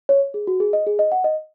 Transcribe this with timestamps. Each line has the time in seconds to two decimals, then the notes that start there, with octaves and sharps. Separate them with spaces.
0.09 C#5
0.34 G#4
0.47 F#4
0.60 G#4
0.73 D#5
0.87 G#4
0.99 D#5
1.12 F#5
1.24 D#5